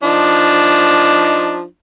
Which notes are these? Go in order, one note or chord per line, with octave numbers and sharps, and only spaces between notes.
F3 D4 D#4